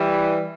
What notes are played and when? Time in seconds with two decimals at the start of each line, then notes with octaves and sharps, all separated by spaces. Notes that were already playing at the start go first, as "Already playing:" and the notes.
Already playing: E3 G3